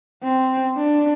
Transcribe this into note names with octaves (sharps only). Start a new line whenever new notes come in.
C4
D4